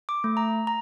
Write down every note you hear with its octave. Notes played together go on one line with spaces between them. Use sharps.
D6
A3
A#5
A#5